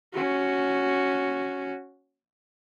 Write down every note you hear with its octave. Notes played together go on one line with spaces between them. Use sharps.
C#4 F#4